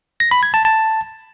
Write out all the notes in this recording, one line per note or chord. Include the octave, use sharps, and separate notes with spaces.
A#6
B5
G#6
A5
A5